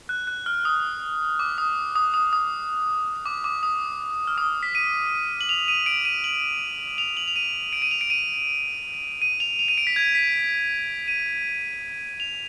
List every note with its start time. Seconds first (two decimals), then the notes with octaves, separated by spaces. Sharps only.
0.09 F#6
0.27 F#6
0.46 F6
0.65 D#6
1.39 D6
1.58 D#6
1.96 D#6
2.14 D#6
2.33 D#6
3.25 D6
3.44 D6
3.63 D#6
4.27 F6
4.38 D#6
4.63 B6
4.75 D#7
5.41 F#7
5.49 F7
5.68 D#7
5.86 D7
6.05 D#7
6.24 F#7
6.98 F7
7.17 F#7
7.28 F7
7.36 D#7
7.73 D7
7.82 D#7
7.91 F7
8.01 D7
8.10 D#7
9.22 D#7
9.40 F7
9.59 F7
9.68 D#7
9.78 D7
9.87 B6
9.96 G#6
10.15 B6
11.08 D#7
12.20 F7